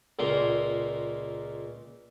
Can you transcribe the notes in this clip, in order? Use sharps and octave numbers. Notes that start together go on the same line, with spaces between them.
C#2 A#2 A#3 A#4 A#5 C6